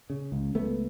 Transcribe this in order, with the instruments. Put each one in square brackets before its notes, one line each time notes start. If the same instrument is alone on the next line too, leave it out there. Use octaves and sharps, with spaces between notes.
[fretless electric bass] C#3
C#2
C#2 A3 B3